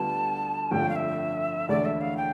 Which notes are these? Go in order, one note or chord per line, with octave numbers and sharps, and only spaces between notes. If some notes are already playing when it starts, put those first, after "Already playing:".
Already playing: D2 D3 G3 B3 F4 A5
G1 F2 D3 F3 A3 G5
F5
E5
E1 D2 D3 A3 D5
E5
F5
G5